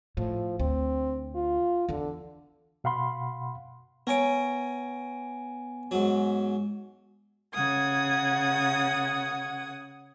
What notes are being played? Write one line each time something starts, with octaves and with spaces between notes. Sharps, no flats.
A2 F3
D2 C4
F4
E2 D3 E3
B2 F5 F#5 B5 C6
B3 A#4 C#5 G#5 D7
G#2 F#3
C#3 F#5 D#6 G#6